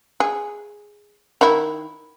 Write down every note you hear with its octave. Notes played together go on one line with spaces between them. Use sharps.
G#4
D#3 E4